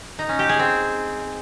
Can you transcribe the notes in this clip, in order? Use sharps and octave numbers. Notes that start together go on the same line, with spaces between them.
D#4
C#4
G4
G#4
C4